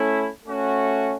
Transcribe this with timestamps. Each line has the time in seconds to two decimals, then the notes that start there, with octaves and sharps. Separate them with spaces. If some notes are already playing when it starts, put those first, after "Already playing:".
Already playing: A3 C#4 E4
0.46 A3 C#4 F#4